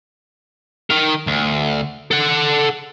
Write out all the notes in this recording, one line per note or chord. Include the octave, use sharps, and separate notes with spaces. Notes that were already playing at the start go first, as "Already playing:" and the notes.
D#3 A#4
D2
A4 F#5